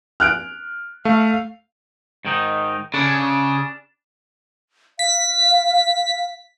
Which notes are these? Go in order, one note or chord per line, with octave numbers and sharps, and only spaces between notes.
F6 F#6 D7
A3 F5
G#2 D#3 D#4
C#3 D4
F5 B6